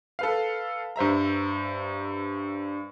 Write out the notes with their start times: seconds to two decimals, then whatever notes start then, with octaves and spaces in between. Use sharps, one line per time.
0.19 A4 B4 F5
0.96 G2 C5 E5 A#5